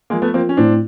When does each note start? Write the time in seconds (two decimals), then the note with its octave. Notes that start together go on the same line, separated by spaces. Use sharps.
0.10 F3 G#3 A#3
0.22 A3 B3
0.34 F3 A#3 C4
0.49 C#4
0.57 A2 C4 D4